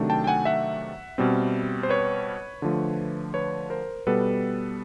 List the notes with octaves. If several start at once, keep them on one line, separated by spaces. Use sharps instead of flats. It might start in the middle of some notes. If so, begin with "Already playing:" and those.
Already playing: C3 D#3 F#3 A3 D4
G5 A5
G5
F#5 G#5
E5 F#5
B2 G3 C4
C5
B4 C#5
D3 F3 A3
B4 C#5
A#4 C5
B2 G3 B3 A4 B4